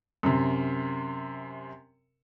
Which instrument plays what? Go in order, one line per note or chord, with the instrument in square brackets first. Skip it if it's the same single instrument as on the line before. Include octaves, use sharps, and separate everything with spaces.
[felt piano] F#2 C3